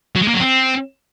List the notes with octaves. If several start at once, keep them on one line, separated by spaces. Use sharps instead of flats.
F#3
G#3
A#3
F#3
C4